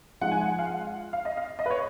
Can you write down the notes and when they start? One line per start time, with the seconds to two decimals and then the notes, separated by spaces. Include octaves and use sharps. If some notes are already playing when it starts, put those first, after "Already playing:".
0.21 F3 G#3 D#4 F#5
0.31 G#5
0.41 F#5
0.59 F5
0.67 F#5
1.13 F5
1.25 D#5
1.37 F5
1.59 D#5
1.66 B4
1.71 C#5